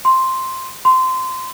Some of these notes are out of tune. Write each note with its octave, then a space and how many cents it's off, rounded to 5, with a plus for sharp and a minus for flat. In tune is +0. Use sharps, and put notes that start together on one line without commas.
C6 +0
C6 -20